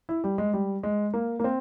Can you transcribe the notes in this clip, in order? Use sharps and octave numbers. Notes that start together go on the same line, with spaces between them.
E4
G3
G#3
G3
G#3
A#3
A#3
C4